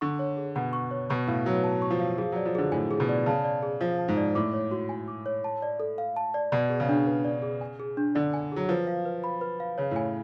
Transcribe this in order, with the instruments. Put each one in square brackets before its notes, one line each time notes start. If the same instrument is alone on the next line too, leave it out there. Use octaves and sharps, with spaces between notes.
[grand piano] D3 [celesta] C#6
[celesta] C#5
G#4
[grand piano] B2 [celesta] F#5
[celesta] C#6
C#5
[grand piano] B2 [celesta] C#6
[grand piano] A2 [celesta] F5
[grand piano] F#3 [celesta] B4
[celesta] A5
C#6
[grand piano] F3
[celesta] F5
[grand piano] F3 [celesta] G#4
[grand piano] F#3 [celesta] D5
[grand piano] F3
[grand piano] D3 [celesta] G#4
[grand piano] A2 [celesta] G#5
[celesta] G#4
[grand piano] B2
[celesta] D5
[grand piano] C#3 [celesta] A5
[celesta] D5
G#4
[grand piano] F3 [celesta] F5
[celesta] A5
[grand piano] G#2
[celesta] D5
[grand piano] A2 [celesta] D6
[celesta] C#5
F#4
G#5
D6
C#5
A5
D5
A4
F5
A5
D5
[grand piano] B2 [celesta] D5
[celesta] G#4
[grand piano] C#3
[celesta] D4
B4
D5
G#4
G#5
G#4
D4
[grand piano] D3 [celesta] D5
[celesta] G#5
[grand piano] F#3 [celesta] G#4
[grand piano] F3 [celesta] B4
[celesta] F5
B4
B5
B4
F5
[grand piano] C#3 [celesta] C#5
[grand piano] A2
[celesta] G#5